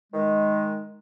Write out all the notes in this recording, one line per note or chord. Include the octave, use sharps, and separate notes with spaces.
D#3 G#3